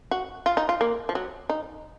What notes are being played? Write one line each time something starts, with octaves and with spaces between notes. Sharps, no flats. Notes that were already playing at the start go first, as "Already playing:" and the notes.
F#4
F4
D#4
F4
A#3
F3
F#3
D#4